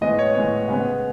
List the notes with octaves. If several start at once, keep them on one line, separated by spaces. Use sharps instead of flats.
A2 G#3 B3 D#5
C#5
A2 G#3 B3 C#5
C#3 G#3 B3